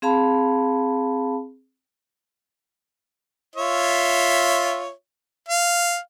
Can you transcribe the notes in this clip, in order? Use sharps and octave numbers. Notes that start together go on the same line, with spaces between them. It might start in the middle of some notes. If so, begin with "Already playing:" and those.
C4 G#4 F5 A5 B5
F4 C#5 E5
F5